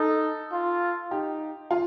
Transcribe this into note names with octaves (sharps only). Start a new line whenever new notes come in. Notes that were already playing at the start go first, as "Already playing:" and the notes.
Already playing: D#4 A4
F4
D#4 G4
F4